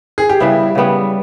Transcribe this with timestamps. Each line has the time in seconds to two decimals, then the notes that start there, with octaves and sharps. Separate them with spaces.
0.18 G#4
0.29 G4
0.40 C#3 G3 B3 E4
0.75 C#3 G3 B3